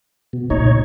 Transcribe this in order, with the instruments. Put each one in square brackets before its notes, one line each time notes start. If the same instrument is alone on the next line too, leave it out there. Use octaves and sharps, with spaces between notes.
[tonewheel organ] B2
[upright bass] C#2 A#2 [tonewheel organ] D#4 C#5